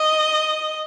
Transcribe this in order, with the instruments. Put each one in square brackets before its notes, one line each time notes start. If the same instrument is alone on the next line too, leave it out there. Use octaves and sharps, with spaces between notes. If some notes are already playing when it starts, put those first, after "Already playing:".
Already playing: [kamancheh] D#5